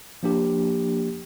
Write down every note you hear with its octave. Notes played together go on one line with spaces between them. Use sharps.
F3 A#3 D4 G4